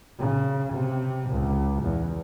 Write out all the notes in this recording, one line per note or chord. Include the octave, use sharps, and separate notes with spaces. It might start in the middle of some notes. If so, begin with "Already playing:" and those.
C#3
C3
C#2
E2